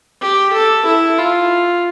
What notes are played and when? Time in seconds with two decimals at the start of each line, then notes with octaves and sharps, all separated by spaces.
0.21 G4
0.53 A4
0.86 E4
1.18 F4